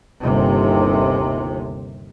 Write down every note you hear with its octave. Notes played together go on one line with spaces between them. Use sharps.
G1 D#2 C3